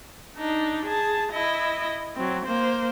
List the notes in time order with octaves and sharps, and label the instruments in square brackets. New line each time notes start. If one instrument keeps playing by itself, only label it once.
[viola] D4 D#4
G#4 A5
E4 D#5
F#3 C4
A#3 C5